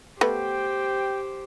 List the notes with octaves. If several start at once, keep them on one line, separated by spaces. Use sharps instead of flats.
A3 B3 G4 C5 G5